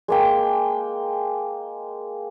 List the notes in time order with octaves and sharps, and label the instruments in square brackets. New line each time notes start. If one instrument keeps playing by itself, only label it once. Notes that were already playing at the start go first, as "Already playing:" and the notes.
[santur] G#3 A#3 G5